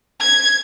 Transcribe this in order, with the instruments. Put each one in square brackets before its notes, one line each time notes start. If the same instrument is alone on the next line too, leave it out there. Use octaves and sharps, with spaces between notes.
[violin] G#6